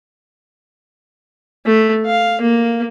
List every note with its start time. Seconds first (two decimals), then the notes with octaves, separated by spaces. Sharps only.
1.66 A3
2.06 F5
2.41 A#3